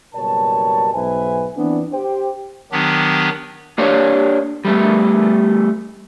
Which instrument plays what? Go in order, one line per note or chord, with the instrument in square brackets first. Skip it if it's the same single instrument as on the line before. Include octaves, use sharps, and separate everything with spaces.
[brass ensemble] F#1 B2 G3 A#4 C#5 A5
B1 G#2 B4 C5 E5 G#5
E3 B3 C4 D4
G4 C5 G5
[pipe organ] D#3 F#3 B3 D4 G4
[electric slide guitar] A#3 D4 G4 C5 C#5
G3 A3 B3